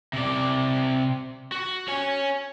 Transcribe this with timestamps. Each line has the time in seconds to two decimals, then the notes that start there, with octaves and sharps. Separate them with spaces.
0.13 C3 D5
1.52 F#4
1.88 C#5 G#5